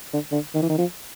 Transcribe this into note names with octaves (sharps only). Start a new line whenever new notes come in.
D3
D3
D#3
E3
D#3
F3